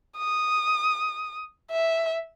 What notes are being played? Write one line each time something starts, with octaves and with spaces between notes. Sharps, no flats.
D#6
E5